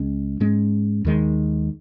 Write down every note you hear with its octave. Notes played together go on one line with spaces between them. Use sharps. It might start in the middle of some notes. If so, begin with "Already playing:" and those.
Already playing: C#2 C#3 G#3 C#4
G#2 G#3 C#4
D#2 D#3 G#3